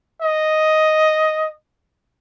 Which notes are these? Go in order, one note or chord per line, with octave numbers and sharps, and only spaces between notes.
D#5